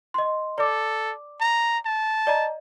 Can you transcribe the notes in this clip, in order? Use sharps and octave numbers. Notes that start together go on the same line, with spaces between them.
D#5 C6
A4 D5 D6
A#5
A5
D5 D#5 A#5